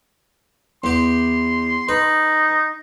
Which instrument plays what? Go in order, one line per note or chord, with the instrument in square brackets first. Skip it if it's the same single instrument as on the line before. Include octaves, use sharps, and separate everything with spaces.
[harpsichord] E2 G4 [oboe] C6
[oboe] D#4 [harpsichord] B4